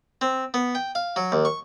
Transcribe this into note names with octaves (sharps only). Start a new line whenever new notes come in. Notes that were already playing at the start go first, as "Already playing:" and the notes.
C4
B3
G5
F5
F#3
D#2
C#6